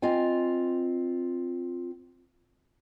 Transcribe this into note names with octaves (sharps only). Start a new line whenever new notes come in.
C4 F4 D#5 G#5